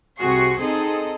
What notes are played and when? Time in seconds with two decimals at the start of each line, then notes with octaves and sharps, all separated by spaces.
0.19 C2 C3 F#4 G#4 C#6 C7
0.60 C4 D#4 G#4 A4 D#5